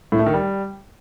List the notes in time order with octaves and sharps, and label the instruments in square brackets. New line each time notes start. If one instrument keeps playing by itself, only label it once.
[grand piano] A2
A3
D#3
G3